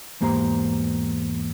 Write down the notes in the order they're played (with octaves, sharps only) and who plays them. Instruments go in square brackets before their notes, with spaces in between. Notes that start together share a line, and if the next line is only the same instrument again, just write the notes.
[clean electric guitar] E2 G#2 A#3 G4 C5 A#5